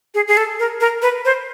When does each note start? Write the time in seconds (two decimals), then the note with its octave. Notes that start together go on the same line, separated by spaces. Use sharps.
0.15 G#4
0.28 G#4
0.37 A4
0.59 A#4
0.81 A#4
1.02 B4
1.25 C5